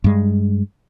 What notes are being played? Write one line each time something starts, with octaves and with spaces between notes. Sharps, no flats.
G2 G#3